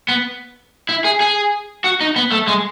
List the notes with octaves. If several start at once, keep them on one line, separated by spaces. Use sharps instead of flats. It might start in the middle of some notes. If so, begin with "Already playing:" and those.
B3
E4
G#4
G#4
F#4
D#4
B3
A3
G#3